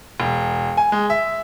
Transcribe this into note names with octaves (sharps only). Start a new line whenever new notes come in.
E1
G#5
G#3
E5